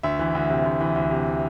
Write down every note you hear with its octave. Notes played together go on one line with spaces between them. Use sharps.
D2 E5
E3
D2
C3
D2
E3
D2
C3